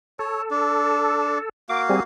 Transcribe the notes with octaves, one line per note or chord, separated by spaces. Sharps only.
A4 C#5
D4
A#3 F#4 F5 D6
G3 C4 G#4